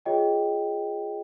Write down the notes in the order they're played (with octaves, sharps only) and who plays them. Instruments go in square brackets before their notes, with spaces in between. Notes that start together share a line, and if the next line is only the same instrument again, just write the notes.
[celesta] F4 G#4 C#5 D#5 G5